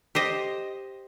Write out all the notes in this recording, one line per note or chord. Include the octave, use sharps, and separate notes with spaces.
G4 C5 D#5